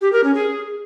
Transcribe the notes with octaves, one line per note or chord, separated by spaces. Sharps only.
G4
A#4
C#4
G#4